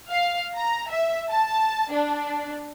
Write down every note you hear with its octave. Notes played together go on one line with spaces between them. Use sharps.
F5
A#5
E5
A5
D4